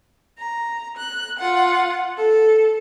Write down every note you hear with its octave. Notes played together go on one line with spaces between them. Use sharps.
A#5
F#6
F4 F#5
A4